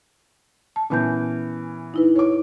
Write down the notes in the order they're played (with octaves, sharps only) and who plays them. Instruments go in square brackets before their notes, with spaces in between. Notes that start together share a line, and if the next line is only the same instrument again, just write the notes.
[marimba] A5
[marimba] A#2 G6 [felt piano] E3 B3 C#4
[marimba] D#4 E4 B4
[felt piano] C#5 D6